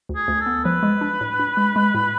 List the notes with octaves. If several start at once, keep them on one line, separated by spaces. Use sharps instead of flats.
D2
G#4
D2
A4
B3
F3 B4
G#3
D4
A2
D4
G#3
G#3
A2